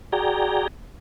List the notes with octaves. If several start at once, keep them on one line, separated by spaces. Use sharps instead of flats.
F#4 G#4 D5 G5 A#5